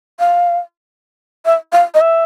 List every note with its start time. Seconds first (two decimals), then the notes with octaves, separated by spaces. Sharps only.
0.19 F5
1.46 E5
1.72 F5
1.94 D#5
2.01 E5